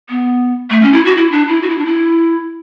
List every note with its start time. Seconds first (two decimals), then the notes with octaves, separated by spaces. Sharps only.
0.09 B3
0.70 A3
0.82 C#4
0.93 E4
1.05 F#4
1.17 E4
1.32 D4
1.48 E4
1.63 F#4
1.70 E4
1.78 D4
1.85 E4